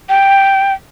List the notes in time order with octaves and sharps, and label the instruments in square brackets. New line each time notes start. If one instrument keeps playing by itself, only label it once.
[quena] G5